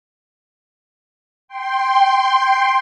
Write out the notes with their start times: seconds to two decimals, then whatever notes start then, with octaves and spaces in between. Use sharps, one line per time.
1.48 G5 C6